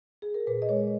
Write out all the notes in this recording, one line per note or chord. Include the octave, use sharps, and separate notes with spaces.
G#4
A#4
A#2 B4
D#5
G#3 C#5